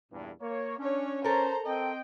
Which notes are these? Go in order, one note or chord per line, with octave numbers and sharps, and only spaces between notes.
E2 G2 A#2
A#3 C#5
C#4 D4 C#5
A4 A#4 C5 A#5
C4 D#5 G5